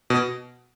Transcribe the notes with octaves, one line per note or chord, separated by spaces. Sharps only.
B2